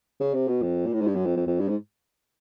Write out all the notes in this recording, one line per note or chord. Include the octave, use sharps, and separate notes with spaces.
C#3
C3
B2
F2
A#2
A2
G#2
G2
F#2
F2
F2
F2
G2
G#2